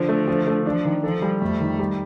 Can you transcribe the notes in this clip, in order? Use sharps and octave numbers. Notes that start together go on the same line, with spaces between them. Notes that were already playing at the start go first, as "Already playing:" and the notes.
Already playing: D3 F3
A3
F3
A3
F3 D4
D#3
F3 A4
G3
F2 A3
D#3
G3